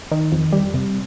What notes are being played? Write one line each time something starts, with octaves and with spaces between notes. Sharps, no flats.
D#3
F2
G3
C3